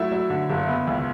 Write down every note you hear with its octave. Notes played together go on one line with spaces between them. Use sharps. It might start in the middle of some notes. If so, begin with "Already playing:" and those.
Already playing: F#3 A3 E4 E5
F#3
D3
F#1
B3
C#2